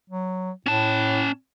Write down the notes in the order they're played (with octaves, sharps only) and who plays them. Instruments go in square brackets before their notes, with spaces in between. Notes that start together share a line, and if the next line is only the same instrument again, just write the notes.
[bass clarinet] F#3
[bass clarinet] A2 [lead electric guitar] C#4 A5